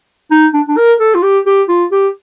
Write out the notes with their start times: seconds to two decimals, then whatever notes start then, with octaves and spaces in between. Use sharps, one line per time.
0.31 D#4
0.54 D4
0.68 D4
0.77 A#4
1.00 A4
1.15 F4
1.23 G4
1.46 G4
1.69 F4
1.92 G4